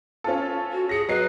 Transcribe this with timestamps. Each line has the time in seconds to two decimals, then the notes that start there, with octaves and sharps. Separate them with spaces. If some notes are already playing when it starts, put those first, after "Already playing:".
0.24 C#4 F4 A4
0.72 F#4
0.89 G#4 A#6 C#7
1.09 F#3 B4 D#5 C7